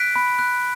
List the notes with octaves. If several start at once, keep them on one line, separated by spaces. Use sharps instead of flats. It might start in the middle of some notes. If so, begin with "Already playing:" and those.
Already playing: F#6 B6 D7
B5
F#6